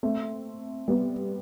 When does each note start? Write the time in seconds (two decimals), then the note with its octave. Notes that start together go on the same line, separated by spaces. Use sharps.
0.03 A3 C4
0.88 G3 B3